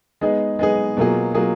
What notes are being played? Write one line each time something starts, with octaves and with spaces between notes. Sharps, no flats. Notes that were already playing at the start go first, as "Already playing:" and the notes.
G#3 B3 D#4 G#4
G#3 B3 D#4 G#4
B2 F#3 A#3 F4 G#4
B2 F#3 A#3 F4 G#4